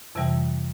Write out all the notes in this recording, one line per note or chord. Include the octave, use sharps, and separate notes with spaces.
F2 C3 E3 G3